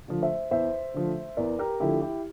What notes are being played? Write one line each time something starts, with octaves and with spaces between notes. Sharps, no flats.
D3 F3 A3
C5 E5
E2 C5 E5
D3 F3 A3
E2 A#4 D5
G4 A#4
D3 F3 A3 E4 G4
E4 G4